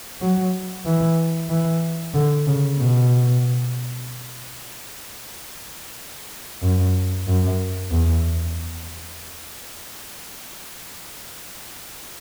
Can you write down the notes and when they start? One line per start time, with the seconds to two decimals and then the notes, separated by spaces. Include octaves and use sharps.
0.21 F#3
0.86 E3
1.50 E3
2.14 D3
2.47 C#3
2.78 B2
6.62 F#2
7.27 F#2
7.91 E2